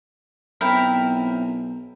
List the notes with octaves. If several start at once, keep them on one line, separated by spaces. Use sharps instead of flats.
B1 C4 E4 A#4